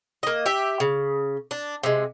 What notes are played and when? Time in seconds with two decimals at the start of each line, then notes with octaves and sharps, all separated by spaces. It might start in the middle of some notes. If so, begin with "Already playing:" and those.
0.23 A#3 D#5
0.46 G4 E5
0.80 C#3
1.51 D4
1.83 C3 G#3